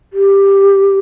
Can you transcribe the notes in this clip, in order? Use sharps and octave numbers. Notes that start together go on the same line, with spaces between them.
G4